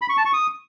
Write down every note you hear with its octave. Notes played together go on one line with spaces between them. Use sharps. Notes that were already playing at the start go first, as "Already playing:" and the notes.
B5
C#6
A5
C#6
D#6